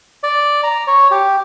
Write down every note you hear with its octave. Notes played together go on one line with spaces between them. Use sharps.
D5
A#5
C#5
G4